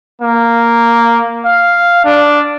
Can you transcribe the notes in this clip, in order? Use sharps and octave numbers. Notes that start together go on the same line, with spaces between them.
A#3
F5
D4